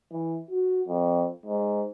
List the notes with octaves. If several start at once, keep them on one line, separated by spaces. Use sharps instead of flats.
E3
F#4
F2
G#2